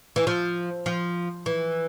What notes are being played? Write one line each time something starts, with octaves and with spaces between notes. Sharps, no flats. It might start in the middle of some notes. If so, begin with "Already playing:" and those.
E3
F3
F3
E3